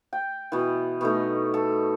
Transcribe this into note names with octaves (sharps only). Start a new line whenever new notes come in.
G5
B2 E3
B2 A3 D#4
A4